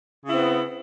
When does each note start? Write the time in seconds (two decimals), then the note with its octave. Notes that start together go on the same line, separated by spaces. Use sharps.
0.23 C#3
0.28 E4
0.32 C4
0.37 B3